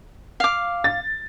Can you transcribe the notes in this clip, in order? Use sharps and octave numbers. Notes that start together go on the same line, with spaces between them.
F5 D6
A6